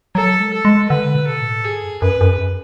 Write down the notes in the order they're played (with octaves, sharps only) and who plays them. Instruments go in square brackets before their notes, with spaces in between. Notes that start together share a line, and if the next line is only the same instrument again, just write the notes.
[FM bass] F#3 [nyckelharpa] A4
[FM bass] G#3
[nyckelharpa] A4
[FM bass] G#3
[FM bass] D3 [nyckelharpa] B4
[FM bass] B2
[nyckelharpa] A4
[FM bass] A2
[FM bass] G#2 [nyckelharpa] G#4
[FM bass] F#2
[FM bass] F#2 [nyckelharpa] B4
[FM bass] F#2